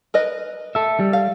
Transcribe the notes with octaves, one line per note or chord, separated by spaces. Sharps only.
A#4 B4 D#5
A4 E5
G3
F5